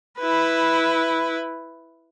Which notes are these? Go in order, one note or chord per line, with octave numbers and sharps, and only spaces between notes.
E4 B4